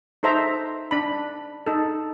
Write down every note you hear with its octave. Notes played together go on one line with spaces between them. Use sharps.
D#4 A4 C5 E5 A#5
D4 B5
D#4 A4